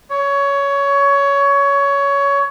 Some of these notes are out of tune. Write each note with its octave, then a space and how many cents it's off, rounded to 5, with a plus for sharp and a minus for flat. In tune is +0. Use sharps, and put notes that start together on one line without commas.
C#5 +15